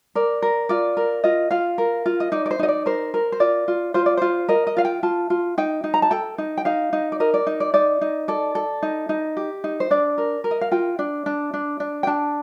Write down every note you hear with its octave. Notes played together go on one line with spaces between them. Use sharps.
A#4 D5
A#4
F4 D5
A#4
F4 D#5
F4 F5
A#4
F4
D#5
D#4 D5
D5
C5
D#4 D#5
D5
A#4 C5
A#4
C5
F4 D5
F4
F4 C5
D5
F4 C5
A#4 D#5
D#5
F4 F5
G5
F4 A5
F4
D#4 G5
D#4
A#5
A5
A4 G5
D#4
G5
D#4 F5
D#4
D5
A#4 D#5
D5
D#4
D5
D#4 D5
D#4
A4 D5
A4
D#4
D#4
G4
D#4
C5
D4 D5
A#4
A#4
D#5
F5
F4 G5
D4
D4
D4
D4
G5
D4 A5